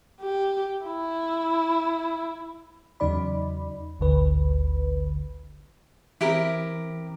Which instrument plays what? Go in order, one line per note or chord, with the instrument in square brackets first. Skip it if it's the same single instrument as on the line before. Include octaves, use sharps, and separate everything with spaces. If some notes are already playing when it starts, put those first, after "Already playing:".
[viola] G4
E4
[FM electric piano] E2 C#3 F#3 D#4 D5 B5
G#1 D2 D3 B4
[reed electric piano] E3 C4 [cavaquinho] E4 G4 A#4